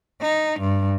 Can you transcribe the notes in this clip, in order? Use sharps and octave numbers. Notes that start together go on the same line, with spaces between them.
D#4
G2